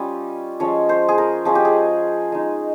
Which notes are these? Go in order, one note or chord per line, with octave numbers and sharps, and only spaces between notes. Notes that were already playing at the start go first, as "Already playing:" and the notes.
Already playing: G3 C#4 F4 D#5
F3 G#3 C#4 F4 C#5
C5
G#4
A#4
F3 G#3 C#4 F4 G#4
G4
G#4
G#3 D#4